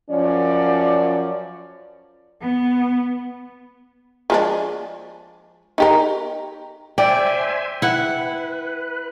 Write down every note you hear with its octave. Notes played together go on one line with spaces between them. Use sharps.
F#2 F3 C#4 D5
B3
F3 G#3 D4
D#4 G4 A#4
C5 D5 E5 G5 G#5
E4 B4 F#5